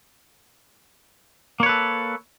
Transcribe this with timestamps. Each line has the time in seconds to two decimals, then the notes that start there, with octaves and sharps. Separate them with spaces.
1.60 A#3
1.63 C#5
1.66 B4
1.69 A4